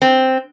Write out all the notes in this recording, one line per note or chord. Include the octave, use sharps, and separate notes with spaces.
C4